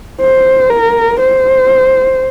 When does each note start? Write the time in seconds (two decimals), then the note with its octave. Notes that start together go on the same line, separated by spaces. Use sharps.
0.21 C5
0.70 A#4
1.20 C5